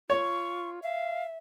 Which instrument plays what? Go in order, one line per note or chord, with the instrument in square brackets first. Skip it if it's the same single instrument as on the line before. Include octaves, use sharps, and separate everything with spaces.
[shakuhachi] F4 [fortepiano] C#5 [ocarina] C#6
[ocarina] E5 [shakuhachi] F5